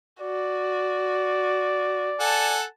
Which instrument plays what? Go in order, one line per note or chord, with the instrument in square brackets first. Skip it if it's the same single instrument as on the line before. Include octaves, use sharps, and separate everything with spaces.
[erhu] F#4 [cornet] D5
[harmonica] A4 F#5 G#5 [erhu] A5